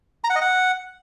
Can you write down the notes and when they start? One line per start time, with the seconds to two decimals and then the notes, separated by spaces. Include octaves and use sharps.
0.24 A#5
0.30 F#5
0.36 D#5
0.41 F#5